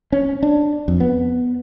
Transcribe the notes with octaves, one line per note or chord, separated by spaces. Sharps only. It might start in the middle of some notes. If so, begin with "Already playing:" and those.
C#4
D4
F2
B3